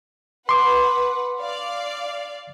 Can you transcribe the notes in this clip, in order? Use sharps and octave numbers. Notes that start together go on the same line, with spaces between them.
B4 F#5 C6 D6
D5 F5